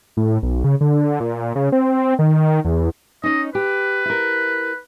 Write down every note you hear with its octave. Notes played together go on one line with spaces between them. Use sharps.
A2
B1
C#3
D3
A#2
C#3
C4
D#3
E2
C#4 D#4 D#5
G4 B4
E4 A#4